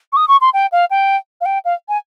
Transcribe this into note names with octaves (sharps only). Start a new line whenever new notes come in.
C#6
D#6
C#6
C6
G5
F5
G5
F5
G5
F5
G#5